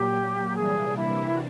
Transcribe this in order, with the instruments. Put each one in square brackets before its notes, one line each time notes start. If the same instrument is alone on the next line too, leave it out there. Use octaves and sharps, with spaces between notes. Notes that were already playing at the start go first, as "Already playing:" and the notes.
Already playing: [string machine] A#2 F#3 A#3 [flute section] G4
[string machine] C3 E3 G3 A#3 D4 [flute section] G#4
[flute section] E4
F#4